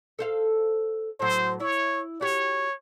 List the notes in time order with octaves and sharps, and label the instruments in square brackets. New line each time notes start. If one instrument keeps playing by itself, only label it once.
[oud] A4 C5 F5
[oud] A2 F#3 [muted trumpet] C5
[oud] E4 [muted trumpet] C#5
[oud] F#4 G4 [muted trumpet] C#5